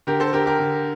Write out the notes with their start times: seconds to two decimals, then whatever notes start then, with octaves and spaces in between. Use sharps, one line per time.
0.07 D3 G4 A#4
0.20 A4 C5
0.33 D3 G4 A#4
0.46 G4 A#4
0.59 D3